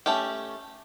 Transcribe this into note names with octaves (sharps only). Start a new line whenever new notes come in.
A3 C#4 G4